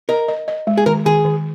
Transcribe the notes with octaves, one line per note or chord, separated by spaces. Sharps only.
A#4 D#5
D#5
D#5
G#3
G#4
D#3 A#4
D#3 G#4
D#3